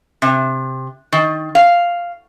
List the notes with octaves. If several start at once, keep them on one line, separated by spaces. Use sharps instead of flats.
C3
D#3
F5